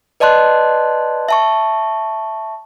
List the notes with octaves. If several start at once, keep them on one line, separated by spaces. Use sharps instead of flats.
B4 D5 D#5 A5 C6 F#6
E5 A5 C#6